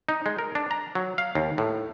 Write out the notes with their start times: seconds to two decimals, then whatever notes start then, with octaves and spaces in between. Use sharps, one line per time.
0.09 D#4
0.26 G#3
0.39 A#4
0.55 D4
0.71 A#5
0.95 F#3
1.18 F5
1.35 D#2
1.58 A2